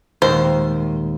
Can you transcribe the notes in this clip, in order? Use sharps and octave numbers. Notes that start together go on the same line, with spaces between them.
D#2 A#2 G#3 A#4 C5